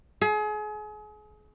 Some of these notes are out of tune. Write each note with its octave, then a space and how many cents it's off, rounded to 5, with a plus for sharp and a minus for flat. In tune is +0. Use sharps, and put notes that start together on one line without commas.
G#4 +35